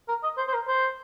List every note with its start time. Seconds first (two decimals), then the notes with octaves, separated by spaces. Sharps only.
0.08 A#4
0.23 D#5
0.37 C5
0.48 C5
0.54 A#4
0.68 C5